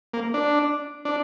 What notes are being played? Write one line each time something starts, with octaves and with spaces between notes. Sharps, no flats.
A#3
D4
D4